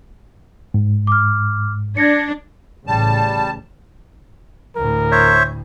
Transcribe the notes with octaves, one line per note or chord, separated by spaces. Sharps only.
G#2
D6 F6
D4 G#6 A#6 C#7
A1 C#3 G3 A5
D2 A2 A#4
C5 C#5 E5